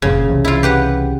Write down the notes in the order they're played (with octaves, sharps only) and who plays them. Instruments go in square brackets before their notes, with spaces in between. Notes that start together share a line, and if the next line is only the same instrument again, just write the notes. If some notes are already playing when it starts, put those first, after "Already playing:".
[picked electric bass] F#1 F2 A#2 [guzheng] C#3
[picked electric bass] C2 C3 E3
[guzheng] E4 F4
G4 B4 F#5